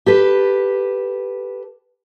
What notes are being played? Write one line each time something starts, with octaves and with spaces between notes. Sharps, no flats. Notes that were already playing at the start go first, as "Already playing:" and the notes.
G4 A4 B4